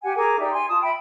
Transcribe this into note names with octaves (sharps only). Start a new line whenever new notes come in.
G4 F#5 G#5
G#4 A#4 G#5 D6
D#4 G4 D5 E5
G#5 C6
F4 A5 D#6
E5 G5 B5